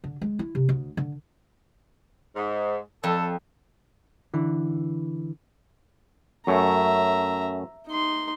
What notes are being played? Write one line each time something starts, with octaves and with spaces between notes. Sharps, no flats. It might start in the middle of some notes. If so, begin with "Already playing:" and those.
D3
G#3
E4
C3
D2
D3
G#2
F2 A4
D3 E3
F#2 A3 C#5 E5 A#5
D#4 C6